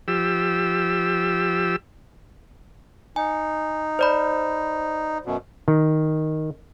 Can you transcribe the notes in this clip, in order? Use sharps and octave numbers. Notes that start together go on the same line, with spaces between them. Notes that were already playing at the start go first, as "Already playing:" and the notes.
F3 G4 E6
D#4 G#5
C5 D5 B5
F#2 B2
D#3